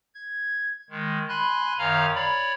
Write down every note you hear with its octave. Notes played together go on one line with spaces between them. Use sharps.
G#6
D#3 G#3
G#5 B5 C6 F#6
F#2 D#3 C#5 F5 A#5 F6
C#5 D5 B5